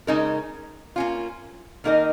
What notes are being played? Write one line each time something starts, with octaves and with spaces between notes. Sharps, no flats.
C#3 G#3 D#4 A#4
A#3 C#4 F4
D#3 A#3 D#4 A#4 D#5